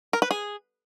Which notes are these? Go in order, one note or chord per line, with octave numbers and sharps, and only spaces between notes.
A#4
B4
G#4